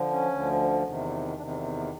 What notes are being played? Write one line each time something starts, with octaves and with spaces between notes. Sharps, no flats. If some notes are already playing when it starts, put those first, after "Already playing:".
Already playing: D3 F3
C#4
D2 D3 F3
E2 C3 D#3
E2 C3 D#3 D4
C4
B3
B3